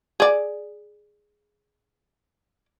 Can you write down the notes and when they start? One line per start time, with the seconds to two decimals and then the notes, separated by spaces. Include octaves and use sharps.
0.20 G#4 D5